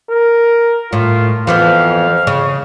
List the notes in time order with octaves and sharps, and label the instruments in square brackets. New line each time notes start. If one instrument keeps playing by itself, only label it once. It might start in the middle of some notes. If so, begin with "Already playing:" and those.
[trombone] A#4
[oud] A2 [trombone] F4
[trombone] F2 [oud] E3 F3 B3 [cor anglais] F5
[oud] C#3